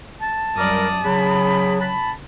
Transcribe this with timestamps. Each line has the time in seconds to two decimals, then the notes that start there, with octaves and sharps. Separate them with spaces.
0.20 A5
0.57 F#2 G3 A#4 D5 D#6
1.04 C#3 F#3 G#4 B5
1.80 A5 B5